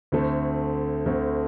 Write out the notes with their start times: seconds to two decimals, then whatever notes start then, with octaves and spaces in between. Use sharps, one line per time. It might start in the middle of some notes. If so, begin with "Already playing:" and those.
0.12 D2 D3 A3 C4
1.06 D2 D3 A3 C4